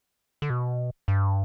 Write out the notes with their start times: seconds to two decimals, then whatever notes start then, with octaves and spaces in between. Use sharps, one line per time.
0.42 D3
0.50 B2
1.08 G2